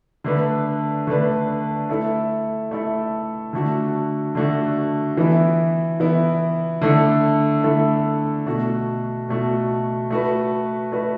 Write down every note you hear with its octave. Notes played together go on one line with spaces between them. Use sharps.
D3 A3 D4 B4
D3 A3 D4 B4
A3 E4 A4
A3 E4 A4
D3 A3 F#4
D3 A3 F#4
E3 B3 E4
E3 B3 E4
D3 A3 E4 A4
D3 A3 E4 A4
B2 A3 F#4
B2 A3 F#4
A3 F#4 B4
A3 F#4 B4